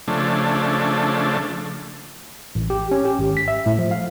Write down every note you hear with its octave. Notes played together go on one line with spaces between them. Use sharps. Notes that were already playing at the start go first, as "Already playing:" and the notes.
C#3 F3 A3 D4
A1
G4
C#4
G4
G#1
B6
E5
A2
F3
F5